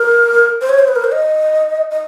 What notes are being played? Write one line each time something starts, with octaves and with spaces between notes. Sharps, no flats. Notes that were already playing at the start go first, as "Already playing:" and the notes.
Already playing: A#4
C5
C#5
C5
B4
A#4
C5
D#5
D#5